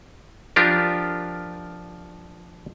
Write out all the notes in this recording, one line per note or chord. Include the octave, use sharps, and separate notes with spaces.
F3 D4 F4 G4 A#4